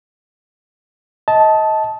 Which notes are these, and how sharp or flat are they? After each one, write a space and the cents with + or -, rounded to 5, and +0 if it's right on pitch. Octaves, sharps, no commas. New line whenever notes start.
D#5 +25 A5 -10